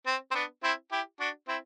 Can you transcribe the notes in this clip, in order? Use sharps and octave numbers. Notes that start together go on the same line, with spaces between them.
C4
C4
B3 D4
C4 E4
E4 G4
D4 F#4
C4 E4